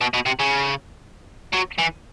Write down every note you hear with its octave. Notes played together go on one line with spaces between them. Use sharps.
B2
B2
C3
C#3
F#3
E3